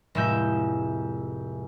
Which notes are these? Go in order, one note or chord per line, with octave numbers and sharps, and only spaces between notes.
F1 A2 G#3 E5 G#5 G6